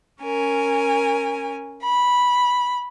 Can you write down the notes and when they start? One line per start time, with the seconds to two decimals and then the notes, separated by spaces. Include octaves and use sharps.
0.21 C#4 A#4 G#5
1.83 B5